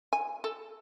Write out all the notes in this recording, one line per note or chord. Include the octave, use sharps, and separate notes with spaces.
G#5
A4